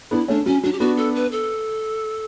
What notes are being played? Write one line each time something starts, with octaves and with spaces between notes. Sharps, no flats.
B3 D4 E4
A3 C#4 D4
F#3 C#4
F#3 D4
G4
B3 D4 F#4
A4
B4
A4